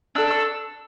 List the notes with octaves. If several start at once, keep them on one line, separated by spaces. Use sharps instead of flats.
D4 A4 E6
E6